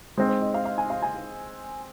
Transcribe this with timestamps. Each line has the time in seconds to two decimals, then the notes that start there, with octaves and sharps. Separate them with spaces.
0.18 G#3 C4 D#4 C5
0.29 C5
0.42 D#5
0.54 F5
0.65 F5
0.78 G#5
0.90 F5
1.02 G#5